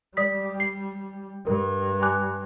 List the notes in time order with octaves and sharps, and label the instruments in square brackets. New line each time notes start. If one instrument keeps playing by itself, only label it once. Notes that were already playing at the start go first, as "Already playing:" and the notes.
[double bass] G3 [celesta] D5 D#6 B6
[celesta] C7
[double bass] G2 [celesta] A#4
[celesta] G#5 D6 F#6